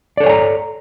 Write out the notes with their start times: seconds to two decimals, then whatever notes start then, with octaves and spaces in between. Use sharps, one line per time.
0.17 D5
0.20 A4
0.23 C#5
0.26 G#5
0.29 A#5